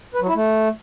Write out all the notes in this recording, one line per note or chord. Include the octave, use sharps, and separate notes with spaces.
B4
F#3
E4
A3